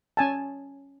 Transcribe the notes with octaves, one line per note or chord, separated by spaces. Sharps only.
C#4 G#5 A5